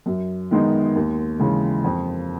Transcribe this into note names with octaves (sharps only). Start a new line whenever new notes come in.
F#2
D#3 G#3 B3 D#4
D#2
C#3 E3 G#3
F2